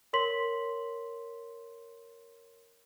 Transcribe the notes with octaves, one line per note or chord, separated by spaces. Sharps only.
A#4 C#5 C6 B6 F#7